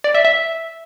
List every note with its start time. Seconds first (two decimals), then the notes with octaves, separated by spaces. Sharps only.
0.04 D5
0.14 E5
0.25 E5